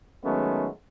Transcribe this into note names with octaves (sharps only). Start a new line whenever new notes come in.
D#3 F#3 G#3 A3 B3 C#4